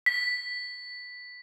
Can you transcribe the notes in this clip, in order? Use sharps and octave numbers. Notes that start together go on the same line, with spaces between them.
B6